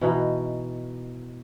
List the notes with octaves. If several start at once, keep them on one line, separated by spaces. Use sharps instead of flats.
B2 E3 D#4